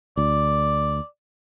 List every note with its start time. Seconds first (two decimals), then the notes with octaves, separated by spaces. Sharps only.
0.17 D2 D5